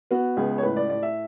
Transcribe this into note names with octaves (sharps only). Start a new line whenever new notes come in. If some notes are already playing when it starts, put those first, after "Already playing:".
B3 F#4
C#2 G#4
C#5
A2 B4
D5
A2 D5
E5